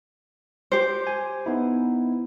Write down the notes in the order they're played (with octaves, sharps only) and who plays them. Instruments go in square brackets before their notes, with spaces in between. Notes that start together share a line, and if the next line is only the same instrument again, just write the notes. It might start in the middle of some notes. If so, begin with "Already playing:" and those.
[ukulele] G4 C5
[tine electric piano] G#5
B3 D#4 E4